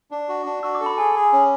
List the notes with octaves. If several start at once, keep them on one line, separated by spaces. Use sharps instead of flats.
D4
F#4
D4
F#4 E6
D6
A4
B5
G#4 G#5
G#4
C#4